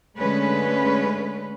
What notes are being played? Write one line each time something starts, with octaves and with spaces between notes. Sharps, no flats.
D3 G#3 A3 C#4 B4